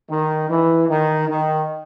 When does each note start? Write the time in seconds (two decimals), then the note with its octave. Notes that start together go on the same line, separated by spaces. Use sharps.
0.09 D#3
0.49 E3
0.89 D#3
1.28 D#3